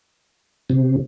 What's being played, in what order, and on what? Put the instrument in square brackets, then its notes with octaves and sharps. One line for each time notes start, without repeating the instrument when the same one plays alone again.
[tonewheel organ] C3